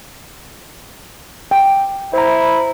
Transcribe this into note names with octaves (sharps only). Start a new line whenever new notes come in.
G5
E4 C5 A#5